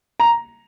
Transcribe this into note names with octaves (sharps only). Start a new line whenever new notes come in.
A#5